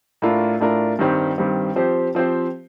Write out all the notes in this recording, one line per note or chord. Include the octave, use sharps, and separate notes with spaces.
A2 A3 D4 F4 A#4
A2 A3 D4 F4 A#4
G2 D#3 G3 C4 G4
G2 D#3 G3 C4 G4
F3 C4 G4 C5
F3 C4 G4 C5